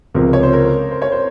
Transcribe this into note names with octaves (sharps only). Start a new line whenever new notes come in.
C#2 C3 F3 A#4
C#5
C5
A#4
C5
C#5
C5